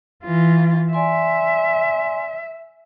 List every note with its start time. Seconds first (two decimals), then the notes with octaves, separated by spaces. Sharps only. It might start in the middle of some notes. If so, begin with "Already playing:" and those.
0.25 E3 F4
0.93 D5 E5 G#5 C6